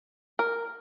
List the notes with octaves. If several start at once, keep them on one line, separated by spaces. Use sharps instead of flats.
A#4